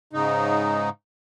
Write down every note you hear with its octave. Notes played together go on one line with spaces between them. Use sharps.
G#2 C#3 D#4